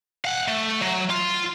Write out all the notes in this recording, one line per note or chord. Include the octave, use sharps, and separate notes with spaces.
F5 F#5
A3
F#3
F4